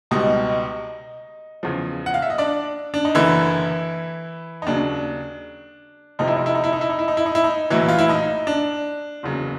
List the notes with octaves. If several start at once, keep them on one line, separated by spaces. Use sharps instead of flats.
C#2 B2 G3 D#4 D#5
E2 C#3 F3
F#5
F5
E5
D#5
D4 D5
D4
D#4
F#1 F#2 D3 E3 E4
D#4
D#2 C#3 F#3 D4
F1 F2 C3 F3 D#4
E4
D#4
E4
D#4
E4
D#4
E4
D#4
E4
D#4
E4
D#4
E4
D#4
A#1 A2 E3 F#3 E4
F4
E4
D#4
D4
F#1 E2 C#3 F#3